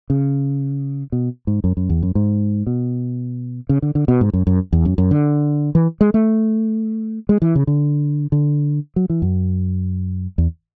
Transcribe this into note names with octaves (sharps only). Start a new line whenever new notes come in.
C#3
B2
G#2
F#2
F#2
E2
F#2
G#2
B2
C#3
D3
D3
B2
G#2
F#2
F#2
E2
F#2
F#2
D3
E3
G#3
A3
G#3
E3
C#3
D3
D3
F#3
E3
F#2
E2